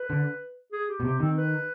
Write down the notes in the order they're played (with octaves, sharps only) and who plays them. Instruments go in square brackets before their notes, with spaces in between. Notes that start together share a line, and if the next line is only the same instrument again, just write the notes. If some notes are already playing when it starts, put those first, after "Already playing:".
Already playing: [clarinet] B4
[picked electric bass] D3
[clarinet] G#4
G4
[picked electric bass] B2
[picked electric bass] C3 [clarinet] G4
[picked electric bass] D#3 [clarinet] C4
[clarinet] B4